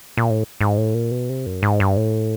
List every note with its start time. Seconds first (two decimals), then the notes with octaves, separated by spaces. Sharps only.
0.17 A#2
0.30 A2
0.61 G#2
0.78 A2
0.94 A#2
1.11 B2
1.29 C3
1.46 F#2
1.63 G#2
1.80 G2
1.97 A2